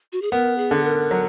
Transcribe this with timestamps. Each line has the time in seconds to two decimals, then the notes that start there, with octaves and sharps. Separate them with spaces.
0.12 F#4
0.22 G#4
0.31 B3 A#4
0.58 G#4
0.71 D3
0.84 A#4
1.11 F#3